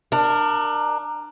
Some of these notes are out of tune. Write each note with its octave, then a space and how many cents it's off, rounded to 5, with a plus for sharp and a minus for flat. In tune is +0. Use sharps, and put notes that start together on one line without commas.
D4 +25 A#4 +0